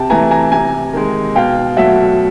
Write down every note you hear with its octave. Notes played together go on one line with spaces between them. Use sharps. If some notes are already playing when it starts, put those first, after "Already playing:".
Already playing: C3 G5 A5
E3 A3 G#5 A#5
G#5 A#5
C3 G#5 A#5
D#3 G#3
B2 F5 G5
F#3 A3 E5 F#5